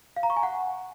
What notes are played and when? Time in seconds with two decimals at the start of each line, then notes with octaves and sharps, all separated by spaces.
0.16 F5
0.23 A#5
0.30 C#6
0.37 G#5
0.43 F#5